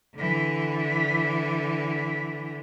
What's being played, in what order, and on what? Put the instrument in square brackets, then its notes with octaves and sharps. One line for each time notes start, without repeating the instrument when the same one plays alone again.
[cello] D3 E3